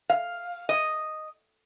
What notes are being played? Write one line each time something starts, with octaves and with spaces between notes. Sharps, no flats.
F5
D#5